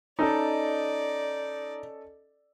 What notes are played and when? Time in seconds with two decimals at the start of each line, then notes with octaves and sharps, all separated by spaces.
0.19 C#4 D#4 A4 D5 D#5